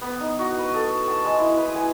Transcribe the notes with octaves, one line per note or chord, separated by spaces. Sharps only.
B3
D#4
F#4
B4
A4
A5
G#3
E4
B4
G#5